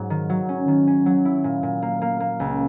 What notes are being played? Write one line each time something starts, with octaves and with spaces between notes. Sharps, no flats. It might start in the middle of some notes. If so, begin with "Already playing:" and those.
Already playing: G#2 F#3
D#3
F#3
C#4
D#3
C#4
F#3
E4
A#2
A#2
A#3
A#3
A#3
C#2